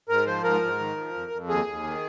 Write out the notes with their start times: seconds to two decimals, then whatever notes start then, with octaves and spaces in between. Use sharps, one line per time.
0.09 G#2 A#4
0.26 F3 C5
0.44 G#2 A#4
0.62 G#2
0.79 D#3
0.97 F3
1.14 F2
1.32 F2
1.48 D#2 G#4
1.66 D#2
1.83 D#3